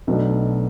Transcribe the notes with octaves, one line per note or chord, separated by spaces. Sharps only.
B1 B2 A3 D4